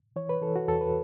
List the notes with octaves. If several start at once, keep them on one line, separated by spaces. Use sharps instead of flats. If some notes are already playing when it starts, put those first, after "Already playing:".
E3 C#5
B4
E3 A4
F#4
E2 A4
B4